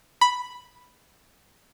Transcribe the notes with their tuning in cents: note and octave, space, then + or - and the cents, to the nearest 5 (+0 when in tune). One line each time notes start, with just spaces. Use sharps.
B5 +0